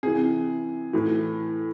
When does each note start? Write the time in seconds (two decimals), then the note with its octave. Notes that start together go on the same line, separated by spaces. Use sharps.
0.03 C3 E3 G#4
0.93 A2 E3